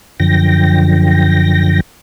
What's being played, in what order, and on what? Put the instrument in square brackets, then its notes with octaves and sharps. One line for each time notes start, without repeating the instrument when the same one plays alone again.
[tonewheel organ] F#2 D3 F3 G5 A#6